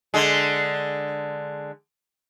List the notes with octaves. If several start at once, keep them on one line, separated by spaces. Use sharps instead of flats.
D3 G#3